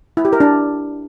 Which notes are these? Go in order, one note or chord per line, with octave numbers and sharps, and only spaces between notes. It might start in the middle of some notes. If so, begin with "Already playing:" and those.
E4
G4
A#4
D4